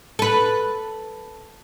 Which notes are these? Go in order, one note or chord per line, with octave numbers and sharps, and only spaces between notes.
A4 B4